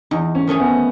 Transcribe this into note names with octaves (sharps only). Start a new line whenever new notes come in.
E2 D#4
C#4
D#3 A3 C#4 G#4
B3